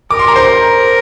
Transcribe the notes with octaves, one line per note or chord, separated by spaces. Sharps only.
A#4 D6
C6
A#5
C5 C6